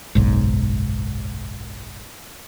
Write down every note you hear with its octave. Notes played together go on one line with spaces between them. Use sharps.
F#1 B1 G#2